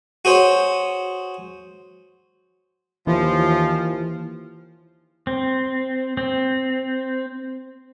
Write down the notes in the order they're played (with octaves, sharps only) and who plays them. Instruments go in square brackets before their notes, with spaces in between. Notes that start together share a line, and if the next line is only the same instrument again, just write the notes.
[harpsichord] F#4 G#4 C5 C#5
[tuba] D#2 [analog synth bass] E3 [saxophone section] F3
[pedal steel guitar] C4
C4